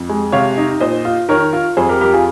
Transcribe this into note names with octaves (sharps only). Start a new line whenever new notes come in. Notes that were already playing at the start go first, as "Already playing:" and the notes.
Already playing: F2
G#3
C3 C#5 F5
D#4
A#2 C5 D#5
F4
D#3 A#4 C#5
F4
F2 G#4 C5
G4 A#4
F2 G4 A#4
F4 G#4